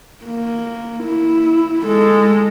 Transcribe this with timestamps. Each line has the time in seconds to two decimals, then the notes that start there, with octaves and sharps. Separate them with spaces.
0.25 A#3
1.04 E4
1.85 G#3 A4